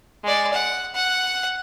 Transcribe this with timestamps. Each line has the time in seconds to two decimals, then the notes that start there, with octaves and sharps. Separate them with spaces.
0.24 G#3 D5
0.53 F#5
0.95 F#5